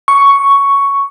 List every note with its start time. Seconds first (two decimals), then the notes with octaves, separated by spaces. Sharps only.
0.08 C#6